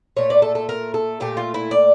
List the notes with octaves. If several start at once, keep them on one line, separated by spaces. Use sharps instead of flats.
A#2 A3 C#5
D5
A4
A4
A#4
A4
A#2 A3 G4
F4
E4
D5